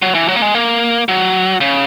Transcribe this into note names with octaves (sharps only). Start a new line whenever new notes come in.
F#3
E3
F#3
A#3
G#3
A#3
F#3
C#3